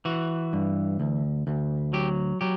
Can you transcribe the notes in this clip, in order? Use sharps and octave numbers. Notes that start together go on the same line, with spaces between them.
E3 F#4
G2
D2
D2
F#3 G4
F#3 G4